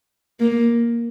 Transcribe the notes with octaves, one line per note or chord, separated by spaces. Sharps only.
A#3